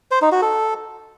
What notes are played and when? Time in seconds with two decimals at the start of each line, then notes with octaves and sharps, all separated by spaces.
0.11 C5
0.22 D#4
0.32 F#4
0.42 A4